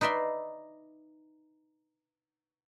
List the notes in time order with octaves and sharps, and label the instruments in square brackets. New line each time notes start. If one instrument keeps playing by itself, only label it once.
[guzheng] D#4 B4 D5 E5 C6